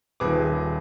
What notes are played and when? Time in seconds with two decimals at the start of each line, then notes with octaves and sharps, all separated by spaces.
0.20 D#1 G#4 B4 D6